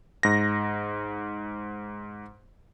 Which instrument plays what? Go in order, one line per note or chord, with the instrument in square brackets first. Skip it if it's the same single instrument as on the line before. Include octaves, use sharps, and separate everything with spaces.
[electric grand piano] G#2 A#6